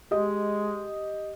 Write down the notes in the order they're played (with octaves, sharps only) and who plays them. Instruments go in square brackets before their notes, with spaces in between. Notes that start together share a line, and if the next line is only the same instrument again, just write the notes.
[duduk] G#3 [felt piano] G4 D#5